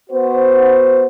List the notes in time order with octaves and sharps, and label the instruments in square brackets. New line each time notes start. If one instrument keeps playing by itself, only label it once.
[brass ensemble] B3 F#4 C5